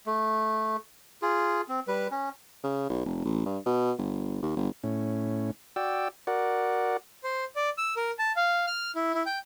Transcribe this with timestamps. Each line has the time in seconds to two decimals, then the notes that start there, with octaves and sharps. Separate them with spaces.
0.06 A3
1.22 F4 G#4
1.68 C4
1.87 G3 B4
2.11 C#4
2.64 C#3
2.89 B1
3.05 F1
3.25 A1
3.46 G2
3.66 B2
3.98 G1
4.42 D#2
4.56 G1
4.84 A2 C#4
5.76 F#4 D5 G5 E6
6.27 F#4 A#4 D5 F#5
7.24 C5
7.56 D5
7.78 E6
7.97 A#4
8.19 A5
8.36 F5
8.67 F6
8.96 E4
9.14 E4
9.26 G5